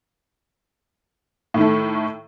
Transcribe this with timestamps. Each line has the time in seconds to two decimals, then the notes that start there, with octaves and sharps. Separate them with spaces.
1.54 A2
1.58 D#3
1.61 A3